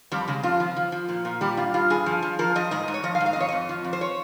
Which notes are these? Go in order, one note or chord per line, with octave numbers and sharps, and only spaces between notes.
F2 G3
C#3 G#3
F2 F4
F3
F3
F3
A#2
A#2
G3 G4
G2 F4
G2 F4
G2 G#4
F3
F3
F3 A#4
F3 D#5
G#2 D#5
G#2
C#5
F3 D#5
F5
G#2
F5
D#5
F2 C#5
F2 D#5
F3
F2
C5
C#5